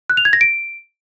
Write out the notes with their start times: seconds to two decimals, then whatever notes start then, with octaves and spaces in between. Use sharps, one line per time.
0.10 F#6
0.17 F7
0.25 G#6
0.33 A#6
0.41 D7